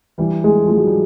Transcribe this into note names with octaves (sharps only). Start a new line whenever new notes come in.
E3 G3
G#3
F3 G#3
F#3
G3